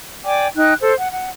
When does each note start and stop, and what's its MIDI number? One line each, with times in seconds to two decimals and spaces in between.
0.24 0.47 74
0.24 0.47 79
0.24 0.47 80
0.24 0.47 86
0.57 0.73 63
0.57 0.73 79
0.57 0.73 90
0.81 0.94 69
0.81 0.94 72
0.97 1.10 78
1.11 1.28 78